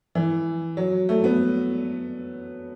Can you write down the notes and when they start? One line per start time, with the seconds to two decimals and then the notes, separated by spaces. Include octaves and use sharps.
0.15 E3
0.77 F#3
1.09 A3
1.24 B3